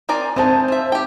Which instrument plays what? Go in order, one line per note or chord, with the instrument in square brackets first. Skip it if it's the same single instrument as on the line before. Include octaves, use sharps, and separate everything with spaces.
[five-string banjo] C4 A#4 D5 [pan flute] G#5
[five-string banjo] E3 G#3 D#4 [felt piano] C4 A5 [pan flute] C5
[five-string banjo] F3 E5
G4 G5